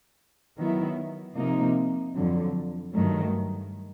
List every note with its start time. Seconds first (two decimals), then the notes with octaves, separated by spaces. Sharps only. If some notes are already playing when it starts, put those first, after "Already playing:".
0.58 D#3 F#3 B3 E4
1.36 C3 F3 A#3 D#4
2.15 F2 D3 F#3
2.94 G2 D#3 F#3 A3